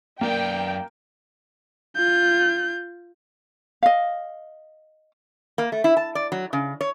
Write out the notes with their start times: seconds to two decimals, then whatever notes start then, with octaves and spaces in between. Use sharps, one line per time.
0.21 F#2 A#3 D5 G5
1.96 F4 G6
3.83 D#5 F5
5.58 A#3
5.72 A3
5.84 E4
5.97 A5
6.15 D5
6.32 F#3
6.53 C#3
6.81 C#5